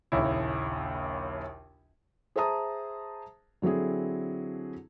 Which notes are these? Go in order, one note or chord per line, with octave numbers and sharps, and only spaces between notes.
A#1 D#2 C#3 E4
G#4 C5 E5 A5 A#5 D#6
D3 F#3 C4 E4 G#4